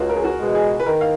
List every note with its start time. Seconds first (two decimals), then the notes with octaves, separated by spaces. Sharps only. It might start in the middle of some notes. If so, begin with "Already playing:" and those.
Already playing: C#2 F4 F#4 G#4
0.09 A#4
0.16 G#4
0.24 F#4
0.40 B2 G#3
0.55 G#4
0.80 B4
0.86 D#3 A#4
1.01 F5